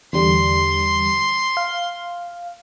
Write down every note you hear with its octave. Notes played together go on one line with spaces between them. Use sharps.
E2 D3 G3 C6
F5